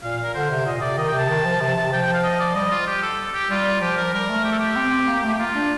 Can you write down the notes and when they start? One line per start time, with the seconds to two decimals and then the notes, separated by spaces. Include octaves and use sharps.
0.03 A#2 F5
0.23 A#4
0.34 D3 C5
0.51 C3
0.66 A#2 D#5
0.81 C3 D5
0.98 D#3 D#5
1.08 G5
1.14 C3 A5
1.29 D#3
1.45 F3
1.61 C3
1.76 C3
1.92 F3 G5
2.02 G5
2.14 F5
2.24 D#5
2.40 D5
2.55 G3 D#5
2.71 F4
2.87 G4
3.03 A4
3.34 G4
3.49 G3 F4
3.81 F3 G4
3.97 A#4
4.14 G3 A#4
4.29 A3
4.44 G4
4.52 A4
4.59 G4
4.76 C4
4.92 C4
5.08 A#3
5.24 A3
5.33 G4
5.39 A#3 F4
5.55 D4